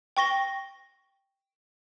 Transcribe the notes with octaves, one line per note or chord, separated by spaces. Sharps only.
G5 C#6 A#6 G7